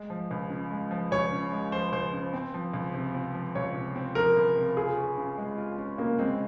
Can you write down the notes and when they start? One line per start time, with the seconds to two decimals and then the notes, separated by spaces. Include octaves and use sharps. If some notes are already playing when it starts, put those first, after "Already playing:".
Already playing: G#3
0.10 F3
0.31 C#2
0.50 C#3
0.71 G#3
0.91 F3
1.11 C#2 C#5
1.32 C#3
1.52 G#3
1.72 F3 C5
1.92 C#2 C5
2.13 C#3
2.33 C4
2.54 F3
2.74 C#2
2.94 C3
3.15 C4
3.34 F3
3.55 C#2 C#5
3.75 C3
3.95 C4
4.15 F3 A#4
4.37 C#2
4.57 C3
4.76 F4 G#4
4.97 C#4
5.17 C#3
5.38 G#3
5.58 F4
5.78 C#4
5.98 C#3 A#3
6.19 G#3 C4